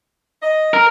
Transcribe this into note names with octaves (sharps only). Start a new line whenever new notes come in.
D#5
A#4